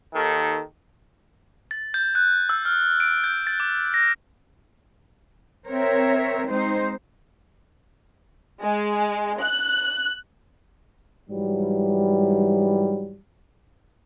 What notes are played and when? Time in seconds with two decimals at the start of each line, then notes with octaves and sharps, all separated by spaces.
0.14 D#2 D#3 A4
1.71 A6
1.94 G6
2.15 F#6
2.49 E6
2.65 F6
3.00 D7
3.24 G6
3.47 A6
3.60 D6
3.94 A#6
5.67 C4 A#4 C#5 E5
6.49 G#3 C4 D#4 C5
8.63 G#3
9.42 F#6
11.30 G#2 E3 F#3 G3